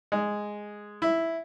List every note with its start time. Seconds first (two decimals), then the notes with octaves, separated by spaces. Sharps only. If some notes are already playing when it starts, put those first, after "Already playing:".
0.12 G#3
1.02 E4